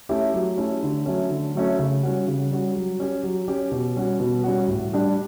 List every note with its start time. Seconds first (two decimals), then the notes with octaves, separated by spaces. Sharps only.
0.09 A3 C#4 E4 G4
0.33 F#3
0.57 A3 C#4 E4 G4
0.82 D3
1.06 F#3 A3 C#4
1.30 D3
1.55 F#3 A3 C#4
1.79 C#3
2.03 G3 C#4 F#4
2.28 C#3
2.52 G3 C#4 F#4
2.76 F#3
3.00 C#4 G4
3.23 F#3
3.48 C#4 G4
3.72 B2
3.96 G3 C#4 F#4
4.20 B2
4.44 G3 C#4 F#4
4.68 A2
4.93 G3 D4 G4